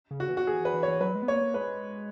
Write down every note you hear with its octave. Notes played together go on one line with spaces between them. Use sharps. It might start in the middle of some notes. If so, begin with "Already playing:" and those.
C#3
F#4
E3
F#4
E3 G#4
E3
B4
E3
C#5
E3
F#3 B4
G#3
B3
A#3 C#5
A#3
G#3 B4